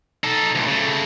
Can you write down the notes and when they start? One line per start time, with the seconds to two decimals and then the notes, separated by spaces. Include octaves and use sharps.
0.24 D#4 A4
0.55 D2 A#2
0.66 C#3 A3